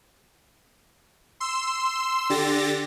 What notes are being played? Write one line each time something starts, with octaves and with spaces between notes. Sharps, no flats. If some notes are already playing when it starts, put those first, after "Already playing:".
C6 E6
D3 G4 A6 A#6